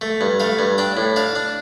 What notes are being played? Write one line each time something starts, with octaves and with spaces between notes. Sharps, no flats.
A3
G2
A3 F5
G2
D4 G5
A2
D4 F5
D4